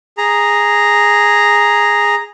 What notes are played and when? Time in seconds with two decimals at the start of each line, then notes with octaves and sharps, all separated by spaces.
0.18 G#4 A#5